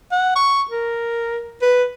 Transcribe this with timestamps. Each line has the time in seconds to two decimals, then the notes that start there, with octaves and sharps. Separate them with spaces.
0.12 F#5
0.36 C#6
0.71 A#4
1.62 B4